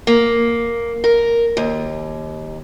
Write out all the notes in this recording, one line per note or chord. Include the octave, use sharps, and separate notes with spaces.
A#3
A#4
D#2